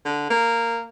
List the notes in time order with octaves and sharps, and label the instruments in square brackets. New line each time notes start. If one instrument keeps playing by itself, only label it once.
[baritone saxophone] D3
A#3